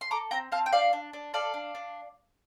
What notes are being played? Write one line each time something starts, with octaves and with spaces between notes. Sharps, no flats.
C6
A4 A#5 D6
C4 G5 A#5
C4 F5 A5
G5
D4 D5 F5
D4
D4
A4 D5 F5
D4
D4